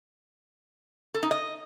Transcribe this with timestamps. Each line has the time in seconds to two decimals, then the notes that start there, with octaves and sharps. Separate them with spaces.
1.14 A4
1.23 D#4
1.31 D#5